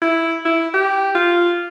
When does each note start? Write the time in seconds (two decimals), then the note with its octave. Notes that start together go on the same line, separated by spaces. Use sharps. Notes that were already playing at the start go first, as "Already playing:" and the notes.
0.02 E4
0.45 E4
0.74 G4
1.15 F4